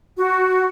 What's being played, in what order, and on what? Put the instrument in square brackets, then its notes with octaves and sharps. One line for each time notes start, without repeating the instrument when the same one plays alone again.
[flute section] F#4